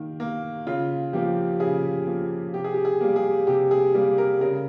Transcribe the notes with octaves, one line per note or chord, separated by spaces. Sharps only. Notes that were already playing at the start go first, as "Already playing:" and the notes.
Already playing: D#3 A#3
A#3
C#3 F4
F3 A#3 G4
C#3 G#4
F3 A#3
C3 G4
G#4
G4
G#4
G3 A#3
G#4
C3 G4
G#4
G3 A#3
A#4
C#3 A#4